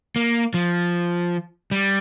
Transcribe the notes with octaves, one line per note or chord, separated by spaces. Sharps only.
A#3
F3
G3